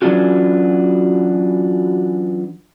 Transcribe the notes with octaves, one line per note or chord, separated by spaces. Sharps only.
E3 F#3 C#4 D4 F4 F#4